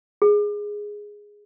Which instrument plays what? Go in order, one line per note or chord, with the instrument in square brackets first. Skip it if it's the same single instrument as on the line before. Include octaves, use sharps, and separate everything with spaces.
[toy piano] G#4